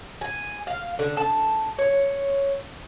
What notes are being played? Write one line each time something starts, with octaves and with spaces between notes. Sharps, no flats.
G#5
F5
D3
A5
C#5